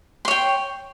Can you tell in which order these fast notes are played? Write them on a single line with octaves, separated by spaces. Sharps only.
C6 C#5 G5